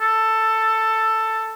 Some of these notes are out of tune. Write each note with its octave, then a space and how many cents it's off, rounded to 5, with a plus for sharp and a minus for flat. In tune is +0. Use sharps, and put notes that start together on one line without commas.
A4 +10